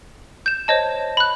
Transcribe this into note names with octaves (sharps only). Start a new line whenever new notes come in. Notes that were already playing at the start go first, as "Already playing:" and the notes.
G6 E7
C5 C#5 D#5 A5
B5 F#6